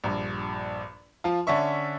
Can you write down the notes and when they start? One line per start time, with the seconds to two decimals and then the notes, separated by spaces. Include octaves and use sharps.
0.04 A#1 G2
1.24 F3 F4
1.47 D3 C#4 D4 E5 C#6